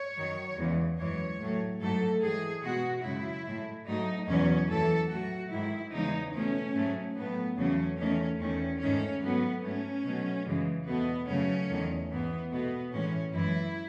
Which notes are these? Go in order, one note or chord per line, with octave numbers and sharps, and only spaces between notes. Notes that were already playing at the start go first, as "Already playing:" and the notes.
Already playing: C#5
F#2 D#3 F#3
E2 C#3 E3 G#3
F#2 E3 G#3 C#5
A2 F#3 A3
G#2 F#3 A3 A4
A2 E3 G#3 G#4
B2 G#3 F#4
F#2 C#3 G#3 E4
A2 G#3
G#2 F#3 A3 D#4
E2 B2 F#3 C#4
F#2 E3 A3 A4
A2 F#3 A3 F#4
G#2 D#3 G#3 E4
E2 C#3 E3 G#3 D#4
B2 A3 C#4
G#2 F#3 A3
A2 F#3 A3 B3
E2 C#3 F#3 A3 C#4
E2 D#3 A3 C#4
E2 D#3 A3 C#4
G#2 D#3 A3 C#4
G#2 F#3 A3 B3
G#2 F#3 A3 C#4
B2 F#3 A3
F#2 C#3 E3 G#3
E2 B2 A3 B3
F#2 C#3 F#3 A3 C#4
E2 D#3 A3
G#2 E3 G#3 B3
B2 A3 B3
A2 E3 G#3 C#4
F#2 E3 G#3 E4